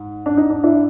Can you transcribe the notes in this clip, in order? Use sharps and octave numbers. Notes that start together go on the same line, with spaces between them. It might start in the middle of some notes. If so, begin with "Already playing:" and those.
Already playing: G#2
D4
D#4
D4
D4 E4